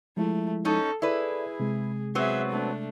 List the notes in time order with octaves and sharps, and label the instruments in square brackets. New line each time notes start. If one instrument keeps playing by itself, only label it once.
[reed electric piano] F3 G#3 E4 [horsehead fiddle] A3
[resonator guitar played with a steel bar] C#4 D#4 [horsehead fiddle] A4
[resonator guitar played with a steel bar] E4 B4 [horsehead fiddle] G#4 [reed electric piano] A4 D5 E5
[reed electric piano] C3 G#3
[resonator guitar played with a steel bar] F#3 B3 C4 [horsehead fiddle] G#4 E5
[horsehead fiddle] A3 D4